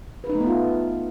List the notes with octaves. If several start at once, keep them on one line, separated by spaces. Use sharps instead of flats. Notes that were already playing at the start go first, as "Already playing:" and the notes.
B4
D#4
A3
B3
F4